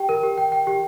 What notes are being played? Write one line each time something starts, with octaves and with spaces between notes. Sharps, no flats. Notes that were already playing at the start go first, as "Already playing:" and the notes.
Already playing: G4 G5
A#4
G4
G5
G5
G4